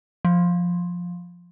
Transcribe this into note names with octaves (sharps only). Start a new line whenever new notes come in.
F3